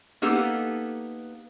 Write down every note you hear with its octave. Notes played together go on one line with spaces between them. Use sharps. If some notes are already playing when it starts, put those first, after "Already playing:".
A#3 B3 D#4 G4 A4